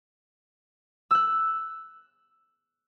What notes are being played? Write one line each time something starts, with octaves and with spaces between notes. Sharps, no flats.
E6 F#6